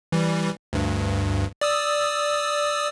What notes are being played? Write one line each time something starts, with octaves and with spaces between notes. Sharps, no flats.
E3 G3
D2 G2
D5 D#6 E6